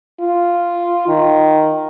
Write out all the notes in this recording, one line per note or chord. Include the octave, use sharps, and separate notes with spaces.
F4
D#3